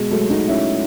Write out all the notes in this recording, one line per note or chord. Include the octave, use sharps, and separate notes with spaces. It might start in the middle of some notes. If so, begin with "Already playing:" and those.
Already playing: B2 G#3
F#3 A3
D#4 F#4
C#4 E4